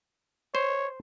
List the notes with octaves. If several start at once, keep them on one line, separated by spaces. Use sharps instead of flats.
C5 C#5